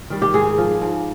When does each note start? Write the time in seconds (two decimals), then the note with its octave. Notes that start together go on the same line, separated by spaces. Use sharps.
0.10 D#3 G3
0.22 G4
0.34 G#2 G#4
0.58 F3
0.81 G#2